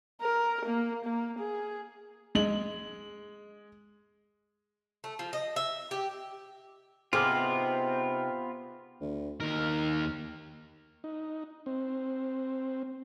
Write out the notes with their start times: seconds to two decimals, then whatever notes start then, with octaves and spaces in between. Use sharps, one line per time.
0.22 A#4
0.66 A#3
1.05 A#3
1.39 G#4
2.35 G#3 F#7
5.04 A3
5.19 F3
5.33 D#5
5.56 E5
5.91 G4
7.13 C3 B3 C4 D#4 F4 G#4 D6 F6
9.01 D2
9.40 D#2 D#3 A#4
11.04 D#4
11.66 C4